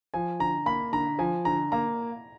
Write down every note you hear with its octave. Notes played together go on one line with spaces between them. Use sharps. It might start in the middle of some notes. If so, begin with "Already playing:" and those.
F3 G#5
D3 A#5
A#3 B5
D3 A#5
F3 G#5
D3 A#5
A#3 A#5